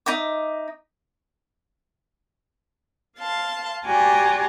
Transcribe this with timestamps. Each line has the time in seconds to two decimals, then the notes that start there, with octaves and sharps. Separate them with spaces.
0.06 D#4 D#5 E5 D6
3.17 F5 A5 C6
3.85 F#4 G4 D5 G#5 A#5 C6